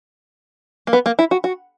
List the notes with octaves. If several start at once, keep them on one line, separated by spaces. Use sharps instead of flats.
A#3
B3
A#3
E4
F#4
F#4